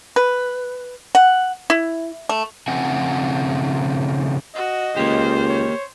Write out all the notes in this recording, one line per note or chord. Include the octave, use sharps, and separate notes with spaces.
B4
F#5
E4
A3
C#3 F3 A3 C4 F#5 G#5
F#4 D#5
C#2 A#3 G4 C5
C#5